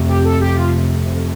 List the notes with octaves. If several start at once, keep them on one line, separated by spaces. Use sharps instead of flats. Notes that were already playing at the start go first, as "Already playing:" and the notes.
Already playing: F2 C3 A3
G4
A4
G4
F4